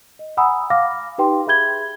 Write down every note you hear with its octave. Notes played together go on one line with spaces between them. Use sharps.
D#5
F#5 G#5 A#5 B5 D#6 E6
F5 D6 F6 A#6
D#4 G4 B4 G5 C6
G#4 E5 B5 G6 G#6 G7